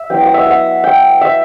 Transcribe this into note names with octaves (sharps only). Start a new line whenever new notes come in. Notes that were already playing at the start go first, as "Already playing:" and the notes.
Already playing: E5
F#3 B3 E4 G5
F#5
E5
F#5
G5
E5